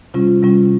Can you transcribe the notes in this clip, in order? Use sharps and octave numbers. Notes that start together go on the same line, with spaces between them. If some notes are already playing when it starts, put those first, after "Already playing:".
C3 G3 C#4 F4
C3 G3 C#4 F4